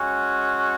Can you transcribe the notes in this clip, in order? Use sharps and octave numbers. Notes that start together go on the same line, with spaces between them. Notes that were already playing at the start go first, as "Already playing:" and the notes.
Already playing: G#3 C#4 F#4